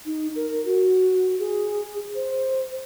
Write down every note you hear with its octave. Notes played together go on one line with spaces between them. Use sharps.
D#4
A#4
F#4
G#4
C5